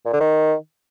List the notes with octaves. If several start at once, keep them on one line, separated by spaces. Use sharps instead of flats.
A#2
D3
D#3